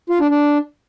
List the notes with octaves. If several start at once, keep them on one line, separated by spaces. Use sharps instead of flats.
F4
D4
D4